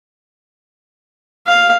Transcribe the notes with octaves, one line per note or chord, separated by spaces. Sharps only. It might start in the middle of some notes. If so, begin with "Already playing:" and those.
F5